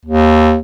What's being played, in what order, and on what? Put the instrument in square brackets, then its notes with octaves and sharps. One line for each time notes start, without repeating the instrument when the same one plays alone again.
[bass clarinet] D#2